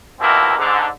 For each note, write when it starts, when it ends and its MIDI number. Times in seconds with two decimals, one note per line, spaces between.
0.20 0.55 39
0.20 0.55 47
0.20 0.55 58
0.20 0.55 60
0.20 0.55 64
0.58 0.88 44
0.58 0.88 50